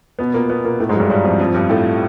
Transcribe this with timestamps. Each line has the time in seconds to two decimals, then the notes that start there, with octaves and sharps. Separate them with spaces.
0.19 B2 B3
0.34 A#2 A#3
0.49 B2 B3
0.64 A#2 A#3
0.80 A2 A3
0.89 G#2 G#3
0.95 F#3
1.00 G2 G3
1.10 G2 G3
1.24 F2 F3
1.39 F2 F3
1.54 G2 G3
1.70 A2 A3